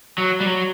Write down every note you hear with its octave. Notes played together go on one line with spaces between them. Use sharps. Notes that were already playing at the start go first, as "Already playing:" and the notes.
F#3
G3
F#3